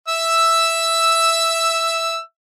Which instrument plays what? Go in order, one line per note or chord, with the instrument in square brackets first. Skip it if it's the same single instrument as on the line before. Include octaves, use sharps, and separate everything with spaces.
[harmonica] E5 E6